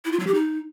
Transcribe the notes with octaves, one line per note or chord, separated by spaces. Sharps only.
E4
F4
F#3
G4
D#4